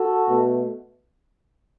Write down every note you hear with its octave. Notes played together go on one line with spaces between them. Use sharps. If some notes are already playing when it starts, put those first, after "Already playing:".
Already playing: F#4 A4
B2 A3